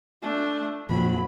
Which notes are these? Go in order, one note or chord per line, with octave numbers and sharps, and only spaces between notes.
A3 D4
F2 A#2 F3 F#3 B5